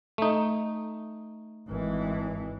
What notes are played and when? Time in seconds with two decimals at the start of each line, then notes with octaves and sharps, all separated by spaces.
0.18 A3 D#4
1.68 G#1 E3